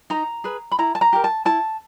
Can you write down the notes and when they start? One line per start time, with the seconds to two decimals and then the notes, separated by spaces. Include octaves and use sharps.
0.10 D#4 A#5
0.44 G#4 B4
0.72 B5
0.79 E4 A#5
0.95 A5
1.01 A#5
1.13 G4 A#4
1.24 A5
1.45 E4 A5